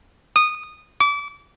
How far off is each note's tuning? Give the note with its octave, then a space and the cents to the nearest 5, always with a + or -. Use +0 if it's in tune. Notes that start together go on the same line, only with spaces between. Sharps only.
D#6 -15
D6 -30